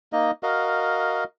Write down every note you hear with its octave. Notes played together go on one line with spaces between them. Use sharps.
A#3 D#4 D#5
F#4 A#4 D#5 F5